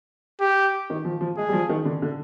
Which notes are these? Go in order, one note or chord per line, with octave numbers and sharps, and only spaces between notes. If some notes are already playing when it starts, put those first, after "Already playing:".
G4
D#3
F3
F3
G#3 G#4
G3
F3
D#3
D3
D3